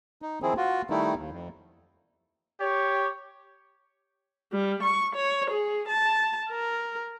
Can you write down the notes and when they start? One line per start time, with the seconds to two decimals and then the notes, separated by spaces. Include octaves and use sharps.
0.22 D#4
0.42 D#3 F3 C4 E4 G#4
0.57 F4 F#4
0.90 D#3 G3 A3 D#4 E4
1.16 D#2
1.31 F2
2.60 G4 C#5
4.52 G3
4.83 C#6
5.16 C#5
5.50 G#4
5.88 A5
6.50 A#4